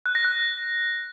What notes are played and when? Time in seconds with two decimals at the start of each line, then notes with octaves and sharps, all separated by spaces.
0.06 F#6
0.15 A#6
0.25 F#6